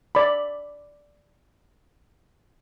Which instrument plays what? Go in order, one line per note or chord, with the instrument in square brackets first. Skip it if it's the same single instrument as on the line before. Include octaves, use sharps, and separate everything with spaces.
[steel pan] D5 B5